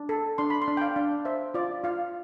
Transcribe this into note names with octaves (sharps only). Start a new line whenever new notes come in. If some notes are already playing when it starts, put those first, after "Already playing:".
Already playing: D4
A4
D4 C6
B5
C6
D4
G5
F5
D4
C5 E5
F4 D5
F4 F5